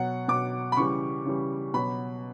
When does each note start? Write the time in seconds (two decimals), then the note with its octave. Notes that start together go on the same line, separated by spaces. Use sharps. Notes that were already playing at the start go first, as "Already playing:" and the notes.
Already playing: B2 F#3 F#5
0.28 B2 F#3 D6
0.72 B5
0.77 C#3 E3 G3 C#6
1.25 C#3 E3 G3
1.74 B2 F#3 B5